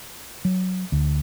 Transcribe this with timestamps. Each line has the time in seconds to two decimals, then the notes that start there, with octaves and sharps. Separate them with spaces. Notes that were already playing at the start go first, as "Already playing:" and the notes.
0.45 F#3
0.92 D2